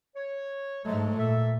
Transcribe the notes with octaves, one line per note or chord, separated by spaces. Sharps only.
C#5
G#2 F3 F#3 G#3 A3
A#2 A4 E5